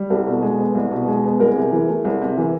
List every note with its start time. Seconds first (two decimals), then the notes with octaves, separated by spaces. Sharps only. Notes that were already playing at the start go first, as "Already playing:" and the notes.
Already playing: G3
0.10 C2 G4 A4
0.26 B2
0.42 G#3
0.59 B3
0.75 C2
0.91 B2
1.08 G#3
1.24 B3
1.40 C2 G#4 A#4
1.56 C3
1.72 E3
1.89 A3
2.05 C2
2.22 C3
2.38 E3